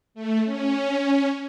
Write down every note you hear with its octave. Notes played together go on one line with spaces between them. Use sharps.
A3
C#4